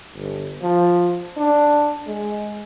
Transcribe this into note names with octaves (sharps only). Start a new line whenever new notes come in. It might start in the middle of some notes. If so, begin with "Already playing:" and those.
G1
F3
D4
G#3